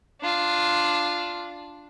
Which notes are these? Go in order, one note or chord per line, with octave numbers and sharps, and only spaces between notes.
D4 F4